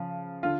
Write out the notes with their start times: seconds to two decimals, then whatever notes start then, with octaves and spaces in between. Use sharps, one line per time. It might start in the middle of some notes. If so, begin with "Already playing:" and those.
Already playing: C#3 F3
0.43 D3 F4